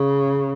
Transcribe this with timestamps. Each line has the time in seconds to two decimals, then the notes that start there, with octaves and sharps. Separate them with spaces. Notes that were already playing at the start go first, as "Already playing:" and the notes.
Already playing: C#3